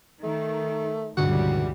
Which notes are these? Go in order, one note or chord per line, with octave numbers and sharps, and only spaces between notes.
D#3 A3
C#2 G2 A#2 D3 E3 G3 F#4